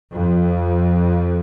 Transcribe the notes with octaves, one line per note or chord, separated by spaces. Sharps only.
F2